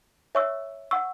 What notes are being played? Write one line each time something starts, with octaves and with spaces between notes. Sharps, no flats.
C#5 E5 C#6 E6
F#5 C#6 E6